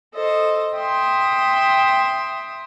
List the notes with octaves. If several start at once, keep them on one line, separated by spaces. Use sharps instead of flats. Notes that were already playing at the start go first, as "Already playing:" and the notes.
A4 C5 D#5
E5 G5 C6 D#6